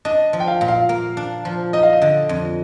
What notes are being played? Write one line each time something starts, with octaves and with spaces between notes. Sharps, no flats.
D4 D#5
F3
G5
F5
A#2
F5
A#3
D4
F3
D#4 D#5
F5
D#5
D3
F2